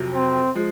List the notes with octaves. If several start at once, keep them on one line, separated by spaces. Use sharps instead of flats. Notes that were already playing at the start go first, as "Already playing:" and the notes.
Already playing: F2 C3 F#3
C4
F3 G#3